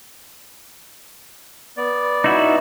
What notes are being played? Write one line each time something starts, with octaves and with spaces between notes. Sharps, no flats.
B3 D5
D#4 E4 F#4